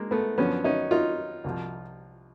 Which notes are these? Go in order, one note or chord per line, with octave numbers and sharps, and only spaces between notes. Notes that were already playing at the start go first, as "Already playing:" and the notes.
Already playing: G#3 A#3
A3 B3
F#2 D3 F3 B3 C#4
C#4 D#4
D#4 F4
C2 C3 F3